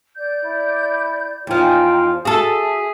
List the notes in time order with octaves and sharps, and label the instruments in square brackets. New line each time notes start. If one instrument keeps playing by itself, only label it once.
[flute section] D5 G6
[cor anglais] E4
[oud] E2 F3 [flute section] D#4 G5 G#5 [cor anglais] F4
[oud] F#4 A4 [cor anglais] G#4 [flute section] E5